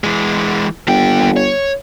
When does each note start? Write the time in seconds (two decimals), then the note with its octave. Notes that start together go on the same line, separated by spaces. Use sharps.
0.04 E3 G#3
0.87 G1 D#2 G5
1.37 C#5